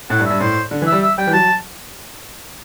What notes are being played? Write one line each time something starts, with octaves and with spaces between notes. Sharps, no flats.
A2 F#5
G2
E5
G2
A2 C5
D3
E3
E5
G3
E5
G3 G5
E3
F#3 A5